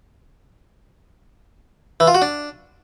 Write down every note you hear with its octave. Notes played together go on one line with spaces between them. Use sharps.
E3
F4
F#4
D4